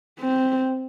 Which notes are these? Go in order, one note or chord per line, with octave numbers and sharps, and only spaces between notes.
C4